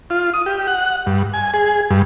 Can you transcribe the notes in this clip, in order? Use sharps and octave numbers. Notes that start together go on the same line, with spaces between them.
F4
D#6
G4
F#5
G2
G#5
G#4
G2